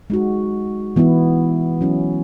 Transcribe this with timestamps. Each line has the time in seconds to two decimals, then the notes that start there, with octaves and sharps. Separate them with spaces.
0.10 G#3 D#4 F#4
0.96 E3 B3 E4
1.81 F#3 C#4 E4